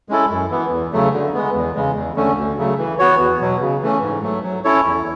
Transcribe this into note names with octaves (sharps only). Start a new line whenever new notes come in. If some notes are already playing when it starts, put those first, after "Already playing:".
G#3 C#4 E4 A4
F#2
E3 B3
E2
C#3 F#3 A3
D3
G#3 B3
E2
C#3 G#3
E2
D3 A3 C#4
D2
C#3 F#3 A3
E3
B3 F#4 C#5
E2
B2 F#3
C#3
E3 A3 C#4
G#2
F#3 A3
F#3
C#4 E4 A4 C#5
E2